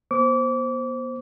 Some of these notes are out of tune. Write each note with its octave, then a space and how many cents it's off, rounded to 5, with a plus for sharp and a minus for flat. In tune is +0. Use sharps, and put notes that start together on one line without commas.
B3 -40 C5 +0 D6 -30